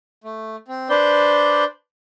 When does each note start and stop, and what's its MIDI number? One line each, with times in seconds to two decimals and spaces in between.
0.24 0.56 57
0.68 0.89 60
0.90 1.64 62
0.90 1.64 71
0.90 1.64 72
0.90 1.64 74
0.90 1.64 91